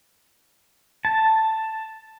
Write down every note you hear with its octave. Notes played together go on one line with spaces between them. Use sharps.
A5